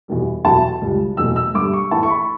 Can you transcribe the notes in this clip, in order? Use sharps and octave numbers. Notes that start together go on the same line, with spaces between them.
E2 B2 G3
E2 B2 F#3 A5
C#2 C#3 G3
E2 B2 F#3 A3 E6
E6
G2 D3 G3 D6
C#6
A2 E3 A3 A5
C#6
B5